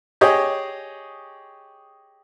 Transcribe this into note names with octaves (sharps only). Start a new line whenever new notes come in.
G4 G#4 C#5 D#5